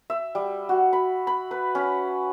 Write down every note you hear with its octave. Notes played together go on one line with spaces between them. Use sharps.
E5
G3
F#4
B5
B5
B4
C#4